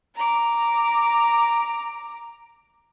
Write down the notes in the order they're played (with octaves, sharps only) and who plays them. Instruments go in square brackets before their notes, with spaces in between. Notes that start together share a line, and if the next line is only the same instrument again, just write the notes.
[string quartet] A#5 D6